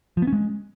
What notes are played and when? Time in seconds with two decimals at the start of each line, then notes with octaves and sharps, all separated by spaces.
0.17 F3
0.22 B3
0.27 C#4
0.33 G#3